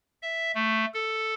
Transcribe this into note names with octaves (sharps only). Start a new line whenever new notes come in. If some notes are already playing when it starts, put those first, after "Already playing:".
E5
A3
A4